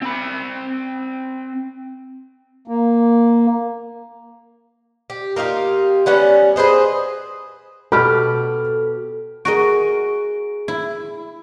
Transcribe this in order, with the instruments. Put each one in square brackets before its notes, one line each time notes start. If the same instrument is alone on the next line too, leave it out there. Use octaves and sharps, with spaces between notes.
[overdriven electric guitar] C4 B5
[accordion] A#3
[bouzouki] G4
A#3 D#4 F4 G4
G3 B3 C#4 F#5
G#4 B4 C5 D#5
[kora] B2 G4 [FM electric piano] A4 [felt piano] B5 F6
[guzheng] F#4 A#4 D#5 [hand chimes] G#4 D7
[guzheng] E4